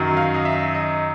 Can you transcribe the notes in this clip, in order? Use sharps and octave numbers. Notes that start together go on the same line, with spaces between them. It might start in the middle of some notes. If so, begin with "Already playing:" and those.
Already playing: F#2 D#3 F#3
F5
D#5
E5
D#5